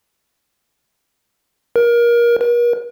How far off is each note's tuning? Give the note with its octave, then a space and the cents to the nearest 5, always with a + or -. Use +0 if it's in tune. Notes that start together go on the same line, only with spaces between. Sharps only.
A#4 +25
A#4 +45